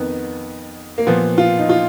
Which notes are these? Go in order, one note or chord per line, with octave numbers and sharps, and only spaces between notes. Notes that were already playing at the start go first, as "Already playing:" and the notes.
Already playing: F2 D#3 B3
A#3
A#2 F3 B3
F4
D#4
F4